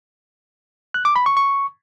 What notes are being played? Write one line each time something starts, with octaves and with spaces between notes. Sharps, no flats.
F#6
D6
B5
C#6
C#6